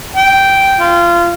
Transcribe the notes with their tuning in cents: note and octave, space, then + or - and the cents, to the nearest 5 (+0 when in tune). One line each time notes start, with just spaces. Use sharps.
G5 -10
F4 -25